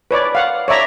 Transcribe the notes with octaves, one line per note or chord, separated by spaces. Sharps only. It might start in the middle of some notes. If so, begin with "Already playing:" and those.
B4 C#5 D5
F5 F#5
C#5 D5 E5 A#5